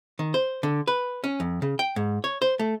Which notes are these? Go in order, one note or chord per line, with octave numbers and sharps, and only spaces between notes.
D#3
C5
D3
B4
C#4
F2
C#3
G5
G#2
C#5
C5
A3